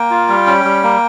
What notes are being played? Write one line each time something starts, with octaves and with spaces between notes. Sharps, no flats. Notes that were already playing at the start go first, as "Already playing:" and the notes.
Already playing: A#3 G5
F4
G3
C#4
G3
A#3